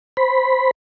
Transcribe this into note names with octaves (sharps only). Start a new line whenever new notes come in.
C5 B5